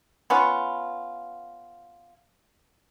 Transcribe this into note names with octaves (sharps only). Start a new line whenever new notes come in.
B3 C#4 F4